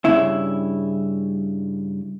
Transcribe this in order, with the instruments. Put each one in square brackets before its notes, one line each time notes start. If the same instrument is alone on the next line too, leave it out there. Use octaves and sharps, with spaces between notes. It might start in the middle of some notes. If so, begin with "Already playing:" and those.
[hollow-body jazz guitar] G2 A#2 C#3 E4